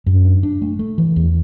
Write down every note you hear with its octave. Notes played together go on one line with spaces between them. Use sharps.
F#2
D4
D4
A3
A3
E3
E2